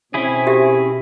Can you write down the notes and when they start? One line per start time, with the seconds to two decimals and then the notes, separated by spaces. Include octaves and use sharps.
0.14 B2 C4 C#4 E4 G#4
0.47 F#4 G4 E5